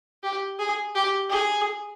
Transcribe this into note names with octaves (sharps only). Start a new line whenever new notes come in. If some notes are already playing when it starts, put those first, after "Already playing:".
G4
G#4
G4
G#4